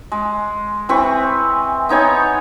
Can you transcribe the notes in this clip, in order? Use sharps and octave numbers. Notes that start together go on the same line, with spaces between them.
G#3
E3 C4 B4 C#6
B3 D#4 C#5 G#5